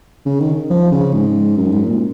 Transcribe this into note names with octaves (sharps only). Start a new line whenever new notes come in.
C#3
D#3
F3
C#3
G#2
F#2
G#2
A#2